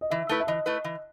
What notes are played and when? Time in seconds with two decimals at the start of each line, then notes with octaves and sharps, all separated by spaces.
0.01 D#5
0.11 E3 E5
0.29 A3 E4 B4
0.40 E5
0.47 E3 D#5
0.66 A3 E4 B4
0.84 E3